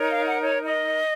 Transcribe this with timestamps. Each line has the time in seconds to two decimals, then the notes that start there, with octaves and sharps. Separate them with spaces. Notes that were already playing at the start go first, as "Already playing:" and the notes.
Already playing: D#4 A#4 C#5
0.09 F5
0.26 F#5
0.42 C#5
0.66 D#5